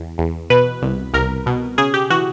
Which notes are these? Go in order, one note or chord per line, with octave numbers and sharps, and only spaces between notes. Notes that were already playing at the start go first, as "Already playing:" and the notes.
Already playing: E2
E2
B2 B4
C2
C2 A#4
B2
C#3 G#4
G4
E3 F#4